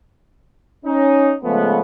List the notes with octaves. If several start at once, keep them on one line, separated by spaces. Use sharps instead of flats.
C#4 D#4
C#3 F3 G#3 A3 B3